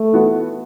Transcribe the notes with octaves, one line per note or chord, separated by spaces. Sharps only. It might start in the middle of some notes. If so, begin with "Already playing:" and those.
Already playing: A3
E3 B3 F#4 A4